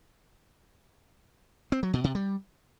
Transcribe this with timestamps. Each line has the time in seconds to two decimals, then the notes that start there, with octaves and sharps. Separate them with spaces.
1.72 C4
1.83 F#3
1.93 B2
2.04 C3
2.15 G3